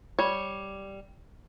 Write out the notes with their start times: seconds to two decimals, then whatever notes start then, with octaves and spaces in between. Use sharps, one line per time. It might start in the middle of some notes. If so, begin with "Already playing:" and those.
0.19 G3 C#5